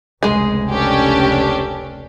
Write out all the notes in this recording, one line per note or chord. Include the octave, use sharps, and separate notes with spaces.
F1 C#2 G#3 G#4
C#4 D4 G4 A4